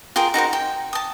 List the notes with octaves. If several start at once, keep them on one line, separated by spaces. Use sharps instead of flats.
F4 G#4 A#4 G5
D#4 F#4 A#4 C5
G5
A5 D#6